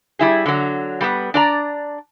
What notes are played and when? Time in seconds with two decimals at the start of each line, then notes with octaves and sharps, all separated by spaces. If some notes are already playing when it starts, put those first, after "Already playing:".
0.19 G3 E4 G#4
0.46 D3 F#3
1.01 G3 A#3 B3
1.34 D4 D5 A#5